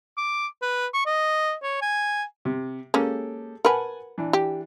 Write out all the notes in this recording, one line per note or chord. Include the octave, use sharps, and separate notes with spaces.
D6
B4
C#6
D#5
C#5
G#5
C3
G#3 A#3 C#4 G4 A4
A#4 B4 F#5 G#5 A5
E3 D4
G4